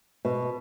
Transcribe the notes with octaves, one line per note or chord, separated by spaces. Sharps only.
B2